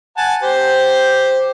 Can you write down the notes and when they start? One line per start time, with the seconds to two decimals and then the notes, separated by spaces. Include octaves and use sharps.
0.17 F#5 G#5 A5
0.43 G4 C5